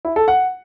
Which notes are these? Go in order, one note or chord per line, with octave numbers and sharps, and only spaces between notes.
E4
A4
F#5